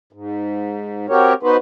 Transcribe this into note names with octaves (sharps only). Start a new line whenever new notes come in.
G#2
C4 F#4 G4 A#4 C#5
B3 D#4 F#4 B4 C5